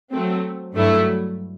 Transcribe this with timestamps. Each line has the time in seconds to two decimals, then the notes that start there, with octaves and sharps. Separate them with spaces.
0.11 F#3 A3 C4
0.73 G2 F#3 A3 E4